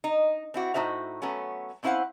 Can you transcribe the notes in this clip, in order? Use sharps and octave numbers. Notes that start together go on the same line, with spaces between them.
D#4
C4 E4 F#4
A2 D#4 F#4 C5 E5
F#3 A3 B3 C#4
C4 C#4 E4 C5 F5 F#5